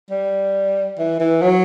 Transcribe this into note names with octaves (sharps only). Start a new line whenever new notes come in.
G3
E3
E3
F#3